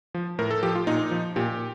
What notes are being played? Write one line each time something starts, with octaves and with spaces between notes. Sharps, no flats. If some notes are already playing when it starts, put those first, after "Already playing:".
F3
A2 A#4
A4
F3 G4
F4
A#2 D#4
F3
A#2 G4